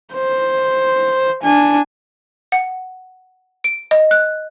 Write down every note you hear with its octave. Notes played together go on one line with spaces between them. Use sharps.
C5
D4 G#5
F#5
D7
D#5
F#6